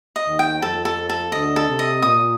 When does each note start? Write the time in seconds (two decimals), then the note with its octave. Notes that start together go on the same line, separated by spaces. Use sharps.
0.16 D#5
0.27 D#2 D#3
0.39 G5
0.62 F2 F3 A4
0.85 A4
1.09 A4
1.32 D2 D3 D#5
1.56 A4
1.68 C3
1.79 D#5
2.02 A#2 D#6